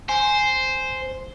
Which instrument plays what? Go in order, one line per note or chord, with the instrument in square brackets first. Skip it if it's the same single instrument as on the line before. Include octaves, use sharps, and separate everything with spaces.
[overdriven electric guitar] C5 [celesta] G#5